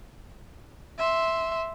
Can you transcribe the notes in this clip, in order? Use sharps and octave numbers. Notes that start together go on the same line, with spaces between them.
E5 C6